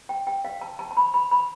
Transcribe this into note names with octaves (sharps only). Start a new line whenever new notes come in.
G5
G5
F5
A5
A5
A5
B5
B5
B5